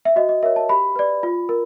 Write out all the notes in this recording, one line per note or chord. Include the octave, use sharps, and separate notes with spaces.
E5
F#4 D#5
D#5
A#4 C#5 E5
A5
G4 B5
B4 D5
F4
A#4